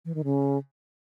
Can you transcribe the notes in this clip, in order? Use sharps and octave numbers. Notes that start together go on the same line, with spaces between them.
E3
D#3
C#3